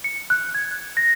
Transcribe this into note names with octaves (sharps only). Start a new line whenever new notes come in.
C#7
F#6
G#6
A#6